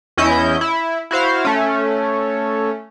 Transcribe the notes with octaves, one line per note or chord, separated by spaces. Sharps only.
E2 C#4 E4 D#5 G6
E4
E4 F#4 C5 F5
A3 C#4